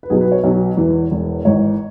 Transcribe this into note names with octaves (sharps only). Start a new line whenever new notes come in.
B4
B1 B2 F#3 G#4
B4
C#5
B1 B2 F#3 C#5
E1 E2 E3
E1 E2 E3
G#1 G#2 E3 C#5